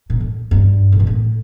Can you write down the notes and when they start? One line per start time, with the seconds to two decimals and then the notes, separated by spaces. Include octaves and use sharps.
0.10 A#2
0.20 A2
0.51 G2
0.92 A2
1.00 A#2
1.07 A2